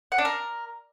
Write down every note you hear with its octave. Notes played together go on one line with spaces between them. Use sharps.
F#5
D4
A#4